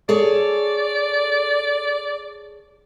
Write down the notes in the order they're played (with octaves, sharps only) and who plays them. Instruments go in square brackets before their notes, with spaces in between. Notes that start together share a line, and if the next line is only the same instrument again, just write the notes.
[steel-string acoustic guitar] G#4 A4 C#5 [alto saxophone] D5